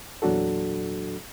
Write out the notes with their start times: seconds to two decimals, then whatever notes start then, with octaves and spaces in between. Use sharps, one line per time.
0.22 E2 A#2 F#3 D4 F#4 A4